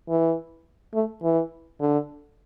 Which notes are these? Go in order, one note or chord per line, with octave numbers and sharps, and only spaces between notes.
E3
A3
E3
D3